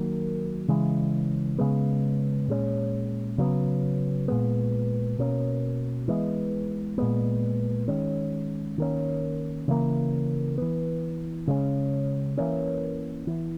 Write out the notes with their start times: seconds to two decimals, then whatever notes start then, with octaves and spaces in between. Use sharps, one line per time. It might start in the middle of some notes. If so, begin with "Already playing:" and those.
Already playing: D#3 F#3 A#3
0.68 C#3 E3 G#3
1.58 C#3 G#3 B3
2.48 A#2 G#3 C#4
3.38 C#3 F#3 B3
4.28 A#2 G#3 B3
5.18 B2 A#3 C#4
6.08 E3 G#3 B3
6.98 A#2 G#3 B3
7.88 D#3 G#3 C#4
8.78 D#3 A#3 C#4
9.68 C#3 E3 A#3
10.58 E3 B3
11.47 C#3 G#3 C#4
12.37 E3 A#3 C#4
13.27 E3 B3